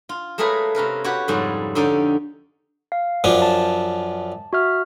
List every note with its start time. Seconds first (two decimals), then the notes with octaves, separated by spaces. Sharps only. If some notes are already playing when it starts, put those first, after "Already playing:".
0.09 F4
0.38 G#3 A3 G#4 A#4 B4 C#5
0.75 C3 C#4 A#4 B4
1.04 F#4 G4 B4 C#5
1.28 F2 G#2 C#3 G3 C#4
1.75 D3 C#4 D#4 G4 D5
2.92 F5
3.24 F#2 F3 D4
3.42 A5
4.53 F#4 E5 F6